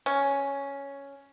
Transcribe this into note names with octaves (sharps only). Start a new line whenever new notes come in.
C#4